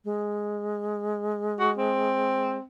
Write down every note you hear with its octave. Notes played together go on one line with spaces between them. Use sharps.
G#3
F#4
C4